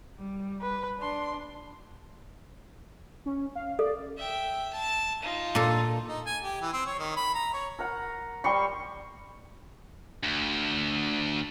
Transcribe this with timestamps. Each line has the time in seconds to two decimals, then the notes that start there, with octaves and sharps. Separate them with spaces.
0.17 G3
0.62 B4
1.00 D4 C6
3.26 C#4
3.55 F5
3.79 A4 D5
4.18 E5 G5
4.73 A5
5.23 D#4 F4
5.55 A#2 A4
6.08 D#4
6.26 G#5
6.44 G4
6.62 E3
6.73 C4
6.86 C#5
6.99 D#3
7.17 B5
7.35 A#5
7.53 C#5
7.79 A#4 F#5
8.44 G3 C6 C#6
10.23 D2